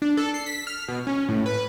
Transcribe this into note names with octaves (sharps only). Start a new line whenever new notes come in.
D4
A4
C7
B6
F6
B2
C#4
A2
B4